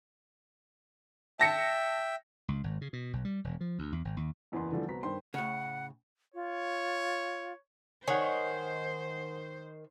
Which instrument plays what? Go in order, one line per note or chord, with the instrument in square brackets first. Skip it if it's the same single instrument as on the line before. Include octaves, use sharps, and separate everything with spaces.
[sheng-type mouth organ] E5 G5 [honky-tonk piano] A5 A#6 C#7
[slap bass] C#2
G#1
C#3
B2
B1
G3
E1
F3
D2
E2
G#1
D#2
[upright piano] F#1 E2 E3 B3 B4 C6
D3 E3 F3 G3 A3
C2 B3 F#4 C5 A#5 B6
G2 D#3 C5 G5 C6
[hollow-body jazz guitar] A2 C#3 [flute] F#5
[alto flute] F4 [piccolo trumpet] C#5
[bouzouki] D#3 [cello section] C5 [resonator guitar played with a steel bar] C#5 [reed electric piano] F#5 G#5